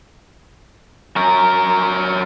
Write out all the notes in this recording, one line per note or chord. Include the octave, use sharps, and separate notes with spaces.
F#3 A#4